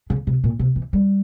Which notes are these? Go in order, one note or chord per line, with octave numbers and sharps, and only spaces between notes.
C#3
C3
A#2
C3
E3
G3